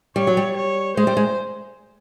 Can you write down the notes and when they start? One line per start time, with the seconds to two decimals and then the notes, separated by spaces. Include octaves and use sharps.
0.16 G3 C#5
0.27 F#3
0.37 G3
0.56 C#5
0.97 G#3 C5
1.07 G3
1.17 G#3